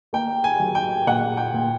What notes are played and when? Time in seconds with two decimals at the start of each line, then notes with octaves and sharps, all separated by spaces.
0.13 A#3 G5
0.44 G#5
0.60 F#3
0.75 G5
1.07 A#2 F#5
1.37 G5
1.54 A#2